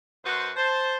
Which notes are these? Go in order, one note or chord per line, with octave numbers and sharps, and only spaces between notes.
F#2 F#4 B4 C5
C5 A5